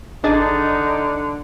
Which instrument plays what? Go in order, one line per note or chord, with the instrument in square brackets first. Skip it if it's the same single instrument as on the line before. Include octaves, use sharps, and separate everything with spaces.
[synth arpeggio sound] G#1 D#5 A6 [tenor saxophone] D3 [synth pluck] D4 G#4 [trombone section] D#4